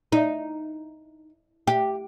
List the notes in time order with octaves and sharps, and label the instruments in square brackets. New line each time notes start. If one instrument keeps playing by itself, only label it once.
[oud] D#4
G4